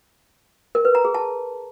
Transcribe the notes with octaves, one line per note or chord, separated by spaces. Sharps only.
A#4
B4
A#5
G#4
A5